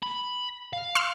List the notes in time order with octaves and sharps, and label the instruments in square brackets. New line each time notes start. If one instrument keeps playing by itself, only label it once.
[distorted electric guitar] B5
F5
[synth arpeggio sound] C6 E6 F6